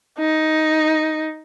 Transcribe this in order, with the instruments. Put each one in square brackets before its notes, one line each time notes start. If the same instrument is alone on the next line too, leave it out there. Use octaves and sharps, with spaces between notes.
[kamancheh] D#4